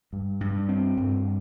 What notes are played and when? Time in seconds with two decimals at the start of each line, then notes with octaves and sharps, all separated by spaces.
0.13 G2
0.41 G2
0.69 C4
0.97 G2